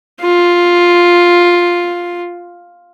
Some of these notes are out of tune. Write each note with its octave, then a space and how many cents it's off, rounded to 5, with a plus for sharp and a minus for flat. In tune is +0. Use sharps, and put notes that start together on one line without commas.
F4 +5